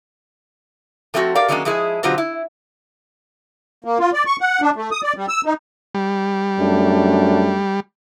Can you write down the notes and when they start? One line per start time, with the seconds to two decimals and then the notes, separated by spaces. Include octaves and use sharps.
1.14 F3 A3 C4 D#4 F#4
1.35 G4 A#4 D5 F5
1.48 D#3 F#3 G#3 A#3 C#4 D4
1.65 F3 G#3 E4 G#4
2.03 B2 D3 F#3 C4 F4 G4
2.18 E4
3.84 A#3
3.99 F4
4.14 D5
4.26 C#6
4.41 F#5
4.61 D4
4.76 A3
4.92 D#6
5.03 D5
5.16 G3
5.29 E6
5.45 D#4
5.95 G3
6.58 F#2 A3 D4